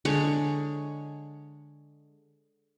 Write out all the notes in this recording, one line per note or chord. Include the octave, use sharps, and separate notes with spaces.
D3 G#3 C#5